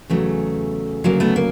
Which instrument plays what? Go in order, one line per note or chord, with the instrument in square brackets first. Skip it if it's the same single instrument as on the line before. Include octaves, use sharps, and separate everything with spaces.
[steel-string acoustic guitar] E2 C#3 F#3 A3
D2 C#3 F#3 A#3
A3 B3
A#3